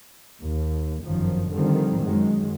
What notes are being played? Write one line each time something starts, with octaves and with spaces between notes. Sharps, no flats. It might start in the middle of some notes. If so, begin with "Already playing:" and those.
D#2
G1 F#2 D#3 F3
D3 D#3 F3 G3 C4
F#2 D#3 F#3 G#3